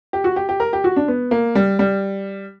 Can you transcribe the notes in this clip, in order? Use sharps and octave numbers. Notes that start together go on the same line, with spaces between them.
G4
F#4
G4
G4
A#4
G4
F#4
D4
B3
A#3
G3
G3